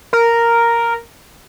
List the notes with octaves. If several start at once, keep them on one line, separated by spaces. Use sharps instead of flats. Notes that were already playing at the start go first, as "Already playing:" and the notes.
A#4